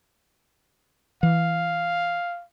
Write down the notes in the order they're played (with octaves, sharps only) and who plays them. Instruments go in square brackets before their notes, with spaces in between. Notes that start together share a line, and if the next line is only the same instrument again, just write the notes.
[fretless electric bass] E3 [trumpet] F5